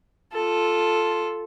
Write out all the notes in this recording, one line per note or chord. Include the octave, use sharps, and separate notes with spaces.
F4 A4